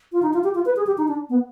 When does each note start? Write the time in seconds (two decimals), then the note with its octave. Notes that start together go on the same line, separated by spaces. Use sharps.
0.12 F4
0.22 D#4
0.33 F4
0.44 G4
0.55 F4
0.66 B4
0.76 G#4
0.87 G4
0.98 D#4
1.08 D4
1.30 B3